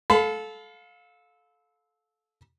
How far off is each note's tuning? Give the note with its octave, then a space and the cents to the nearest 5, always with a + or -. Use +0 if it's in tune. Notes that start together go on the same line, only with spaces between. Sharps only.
A4 -20 F5 +20 B5 +30